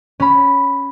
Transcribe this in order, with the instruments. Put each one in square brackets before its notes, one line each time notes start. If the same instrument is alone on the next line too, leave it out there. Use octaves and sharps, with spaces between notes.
[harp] C#4 B5